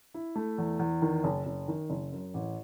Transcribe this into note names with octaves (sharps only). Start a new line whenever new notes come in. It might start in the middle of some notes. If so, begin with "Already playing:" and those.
E4
A3
E2
E2
D#3
F#1
F#1
D#3
F#1
F#2
A1